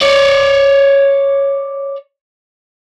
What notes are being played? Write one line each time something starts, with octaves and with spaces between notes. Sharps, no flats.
C#5 D5